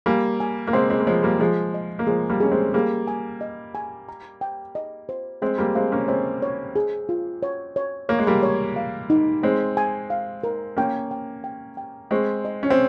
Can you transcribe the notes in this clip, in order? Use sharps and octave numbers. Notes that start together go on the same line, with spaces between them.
G3 A#3 G#5
G#5
A#3
G#3 C4 C6
G#3 C4
A#3
F3 G#3 C#5
G3 A#3
F3 G#3 G#4
D#5
A#3
F3 G#3 G#4
G3 A#3
C#4 G#4
G#3 C4
G3 A#3 G#4
G#5
D#5
G#5
A#5
G5
D#5
C5
G#3 C4 G#4
G3 A#3
G#3 C4 F5
A#3 C#4
G#3 C4 C#5
C#5
G#4
F4
C#5
C#5
A#3 C#5
G#3
G3 A#3
C#5
F5
D#4
G#3 C4 C#5
G#5
F5
A#4
A#3 C#4 G5
G5
G5
G5
G#3 C4 C#6
D#5
C#4
C4